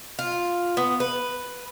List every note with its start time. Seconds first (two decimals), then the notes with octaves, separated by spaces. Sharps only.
0.19 F4
0.77 B3
1.00 B4